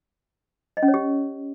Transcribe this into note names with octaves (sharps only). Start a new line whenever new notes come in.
D#5
C#4
C#5
G4